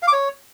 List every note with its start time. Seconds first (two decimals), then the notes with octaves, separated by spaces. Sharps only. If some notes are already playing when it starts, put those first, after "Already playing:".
0.03 F5
0.08 D6
0.13 C#5